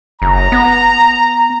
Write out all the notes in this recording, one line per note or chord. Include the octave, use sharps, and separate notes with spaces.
F#1 A#5
B3